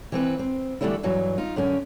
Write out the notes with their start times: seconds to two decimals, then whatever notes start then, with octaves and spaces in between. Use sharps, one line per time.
0.12 E3 C4 B4
0.39 C4
0.81 D3 E3 G3 A3 C#4 E4
1.03 G2 E3 F#3
1.38 D#4 F4
1.56 F#2 D3 C#4